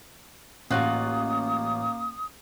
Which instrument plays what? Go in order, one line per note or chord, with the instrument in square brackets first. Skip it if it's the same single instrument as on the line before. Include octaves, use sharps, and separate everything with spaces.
[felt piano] A1 F#6 [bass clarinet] A#3 [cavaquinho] F4 F#4 G#4 [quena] D#6